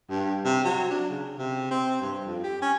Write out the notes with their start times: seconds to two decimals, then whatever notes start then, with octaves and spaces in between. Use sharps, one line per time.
0.10 G2
0.45 C3
0.64 F#3
0.90 D4
1.10 C#3
1.38 C3
1.71 C4
2.01 G2
2.26 F2
2.44 G4
2.62 C#4